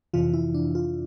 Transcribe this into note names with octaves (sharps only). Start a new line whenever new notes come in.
F2 C3 E3 F4
E4
D4
F4